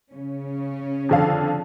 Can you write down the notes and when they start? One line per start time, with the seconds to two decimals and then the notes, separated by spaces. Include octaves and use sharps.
0.12 C#3 C#4
1.09 F2 D3 F5